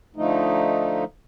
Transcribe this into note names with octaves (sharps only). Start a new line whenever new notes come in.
D3 F3 A3 D#4